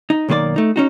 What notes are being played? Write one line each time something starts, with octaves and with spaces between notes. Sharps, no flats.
D#4
B1 D#3 A#3 B4 D5
A3 D#4
C#4 D#4 F#4